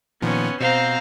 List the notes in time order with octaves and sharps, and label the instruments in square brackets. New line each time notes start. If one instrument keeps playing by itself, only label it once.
[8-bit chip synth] A#2 D#3 F3 [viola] B3 C#4
[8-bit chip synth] B2 [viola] C4 C5 [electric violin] F5 A#5